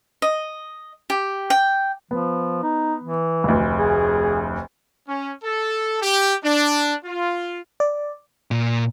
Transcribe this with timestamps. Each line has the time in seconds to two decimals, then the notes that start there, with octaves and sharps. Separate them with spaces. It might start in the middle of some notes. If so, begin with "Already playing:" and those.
0.22 D#5
1.10 G4
1.50 G5
2.11 F3 B3
2.62 D#4
3.03 E3
3.44 F1 D2
3.78 G#4
5.07 C#4
5.44 A4
6.02 G4
6.43 D4
7.04 F4
7.80 D5
8.51 A#2